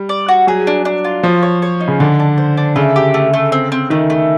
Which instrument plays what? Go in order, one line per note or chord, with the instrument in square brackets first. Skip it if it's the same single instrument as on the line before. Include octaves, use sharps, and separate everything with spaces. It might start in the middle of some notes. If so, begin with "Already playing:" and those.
Already playing: [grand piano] G3
[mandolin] D5
F#4
[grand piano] F#3 [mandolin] G#4
[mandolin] D4
D4
F4
[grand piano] F3 [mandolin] C#5
[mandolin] C#5
C#5
D#4
[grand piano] C#3
[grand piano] D3 [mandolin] D4
[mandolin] D4
C5
D4
[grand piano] C#3 [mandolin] A3
[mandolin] G4
A3
A3
C4
C4
[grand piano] D#3 [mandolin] A3
[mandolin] A3